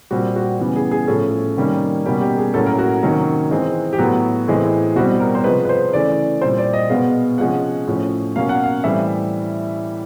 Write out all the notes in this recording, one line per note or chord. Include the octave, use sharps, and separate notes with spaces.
A#2 G3 C4 F#4
F#4
C#3 E3 G3 B3
G#4
G#4
A2 F3 A3 C#4 A4
C3 D#3 G3 A#3 C#4
B2 G3 A#3 C#4 G4
G4
G#4
A2 F#3 A#3 C#4 A4
A#4
F#4
C3 D#3 F#3 A#3 C#4
E3 G#3 C4
G4
A2 F#3 B3 F#4
A2 E3 G#3 C4
B2 G3 C4 F#4
A#4
C5
C3 F3 G#3 B4
B4
C5
C#3 E3 A3 D5
A#2 G3 C4 C5
D5
D#5
B2 G#3 B3 F5
C3 F3 G#3 C#4 F#5
A2 F3 A3 C#4
B2 F#3 A#3 C#4 F5
F#5
F5
A2 E3 G3 C4 E5